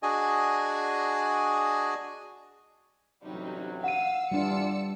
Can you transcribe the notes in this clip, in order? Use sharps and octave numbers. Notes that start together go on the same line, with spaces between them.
D4 F#4 G#4 D#5 G#5
A1 C3 F#3 G3 D#4
F5 F#5 E6 D#7
G2 E3 G3 D4 F4 D5 E6 C#7